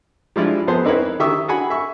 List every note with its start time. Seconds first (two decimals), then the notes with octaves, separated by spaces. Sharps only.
0.36 F3 G3 G#3 D4 E4 F4
0.67 F2 B3 G#4 C5 A5 C6
0.85 C4 D#4 E4 A#4 B4 C#5
1.19 D#3 G4 E5 C#6 D#6 E6
1.48 F#4 G#4 F#5 G#5 B5
1.70 E5 C#6